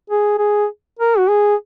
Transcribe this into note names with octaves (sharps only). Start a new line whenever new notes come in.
G#4
G#4
A#4
F#4
G#4